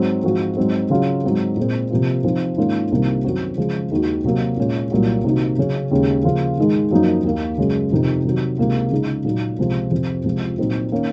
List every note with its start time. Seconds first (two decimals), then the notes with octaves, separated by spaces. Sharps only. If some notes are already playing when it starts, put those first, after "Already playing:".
Already playing: G#2 F#3 C4
0.24 G#2 F3 C4 F#4
0.57 G#2 F#3 C4
0.90 C#3 F#3 C#4 F4
1.24 G#2 F#3 C4
1.57 A#2 G#3 C4
1.90 C3 F3 A#3 F4
2.24 C3 F3 C4 D#4
2.57 G#2 D#3 A#3 C#4 F4
2.91 C2 C3 D#3 A#3 F4
3.25 F#2 D#3 F#3 C4 F#4
3.57 C#3 F3 G#3
3.91 D#2 D#3 G#3 D#4 F#4
4.24 C3 F#3 A#3
4.57 A#2 G#3 C#4 F4
4.91 C2 A#2 F#3 A#3 F4
5.24 C3 D#3 A#3 D#4 F#4
5.58 C#3 F#3 C#4
5.91 D#2 C#3 G#3 C#4
6.24 C#3 F3 A#3 F4
6.58 G#2 D#3 G#3 D#4
6.91 F#2 F3 A#3 D#4 F#4
7.24 D#2 D#3 A#3
7.58 F#2 C#3 G#3 C#4
7.91 F2 C3 D#3
8.24 C3 D#3 F#3
8.58 C#2 C3 D#3 A#3 F4
8.91 C#3 G#3 D#4
9.25 A#2 F#3 A#3 D#4
9.59 C#2 C3 F3
9.91 F2 C3 F3 C4
10.24 C#2 C3 F3
10.58 A#2 F#3 C4 D#4
10.92 D#3 A#3 C#4